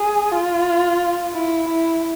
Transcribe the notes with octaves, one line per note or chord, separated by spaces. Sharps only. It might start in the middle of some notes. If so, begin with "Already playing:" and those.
Already playing: G#4
F4
E4
E4